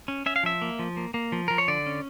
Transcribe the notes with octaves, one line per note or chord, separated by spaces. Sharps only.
C#4
C#4 E5
F5
F3 E5
A#3
F3
A#3
A#3
F3
F3 A#4
C#5
D3 D5
C#4